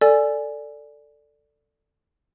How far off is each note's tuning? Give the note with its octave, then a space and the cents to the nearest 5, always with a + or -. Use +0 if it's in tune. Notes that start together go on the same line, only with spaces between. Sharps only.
A4 +10 D5 +0 G#5 +0